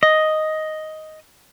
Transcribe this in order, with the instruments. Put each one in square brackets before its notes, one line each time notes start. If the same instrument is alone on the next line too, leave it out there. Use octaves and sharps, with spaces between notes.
[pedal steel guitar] D#5